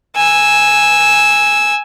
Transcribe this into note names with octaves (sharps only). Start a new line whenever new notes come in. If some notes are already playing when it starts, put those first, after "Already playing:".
G#5 E6